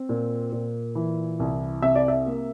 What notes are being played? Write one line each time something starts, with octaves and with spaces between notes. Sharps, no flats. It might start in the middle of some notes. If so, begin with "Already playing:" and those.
Already playing: C4
A#2
A#2
E3
C2
C3 E5
D5
E5
A#3